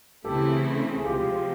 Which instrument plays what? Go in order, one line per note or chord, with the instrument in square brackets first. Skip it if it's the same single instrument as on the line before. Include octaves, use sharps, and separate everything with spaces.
[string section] C#3 E3 A3 C4 E4 [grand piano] G4 A4
[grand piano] G#4
[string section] C3 F3 G#3 C4 [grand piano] F4 G4